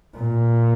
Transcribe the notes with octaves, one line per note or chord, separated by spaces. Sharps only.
A#2